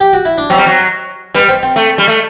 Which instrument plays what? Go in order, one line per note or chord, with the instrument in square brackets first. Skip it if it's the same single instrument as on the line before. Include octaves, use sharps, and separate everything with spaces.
[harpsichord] G4
F#4
E4
D4
[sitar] F#3 [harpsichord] C4
[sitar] G3
F#3
[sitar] G3 [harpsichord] B3
[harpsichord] C4
C4
[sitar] A3
G3
A3